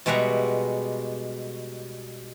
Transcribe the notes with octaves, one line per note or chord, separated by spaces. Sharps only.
B2 G3 G#3 E5 F#5 A#5